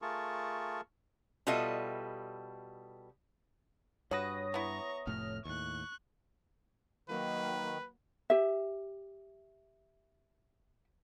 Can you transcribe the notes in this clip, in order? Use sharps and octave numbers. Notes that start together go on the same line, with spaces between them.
A3 F4 G#4 A#4 A5 C#6
B2 G3 F4 A4 D#5 E5
G2 F#4 B4 C#5 D#6 A#6
B3 E4 A#5 C#6
F1 A2 A3 F6
D#2 A2 C#6 F#6
D#3 F#3 A#3 B4
G4 E5